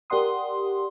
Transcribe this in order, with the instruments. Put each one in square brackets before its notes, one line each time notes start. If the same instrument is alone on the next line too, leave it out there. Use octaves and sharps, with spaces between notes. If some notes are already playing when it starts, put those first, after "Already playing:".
[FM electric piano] G4 A#4 D5 F#5 C6 D#6